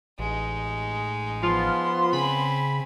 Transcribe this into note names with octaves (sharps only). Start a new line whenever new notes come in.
A1 G#3 D#4
F3 B3 F4 C6
C#3 C4 G#5 B5